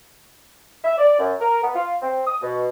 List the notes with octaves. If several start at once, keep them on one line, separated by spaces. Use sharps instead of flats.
E5
D5
F#2
A#4
B3
F4
C4
D#6
B2